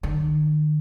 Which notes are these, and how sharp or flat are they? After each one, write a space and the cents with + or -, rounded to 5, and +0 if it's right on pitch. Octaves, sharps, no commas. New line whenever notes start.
D#3 -40